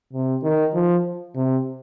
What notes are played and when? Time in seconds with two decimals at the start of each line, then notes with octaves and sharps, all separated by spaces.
0.13 C3
0.43 D#3
0.74 F3
1.35 C3